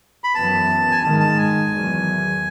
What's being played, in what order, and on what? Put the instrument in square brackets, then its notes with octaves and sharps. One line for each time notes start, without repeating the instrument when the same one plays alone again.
[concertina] B5
[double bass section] F#2 E3 B3 [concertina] A5
[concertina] G#5
[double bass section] G#2 D#3 G#3 [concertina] A5
[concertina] A5
G#5
[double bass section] E2 D#3 F#3